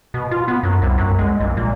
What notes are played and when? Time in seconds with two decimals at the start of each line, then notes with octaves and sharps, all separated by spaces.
0.14 B2
0.31 F4
0.48 B3
0.63 F#2
0.82 C2
0.98 F#2
1.19 G#3
1.40 A#1
1.57 A#2